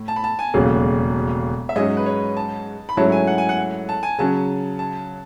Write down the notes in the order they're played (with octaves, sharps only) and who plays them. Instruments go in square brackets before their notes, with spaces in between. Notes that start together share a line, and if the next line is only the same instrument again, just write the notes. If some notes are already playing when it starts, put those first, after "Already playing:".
Already playing: [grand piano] A2
[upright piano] A5
B5
A5
G#5
[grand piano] E1 D#2 C#3 F#3 A3
[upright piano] E5
[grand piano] G#2 F#3 C#4 G#4 [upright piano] D#5
[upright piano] B4
C#5
A5
B5
[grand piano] G#2 F#3 A3 C#4 E4 [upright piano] A5
[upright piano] G#5
F#5
G#5
F#5
A5
G#5
[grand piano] C#3 F#3 C#4 [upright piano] A5
[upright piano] A5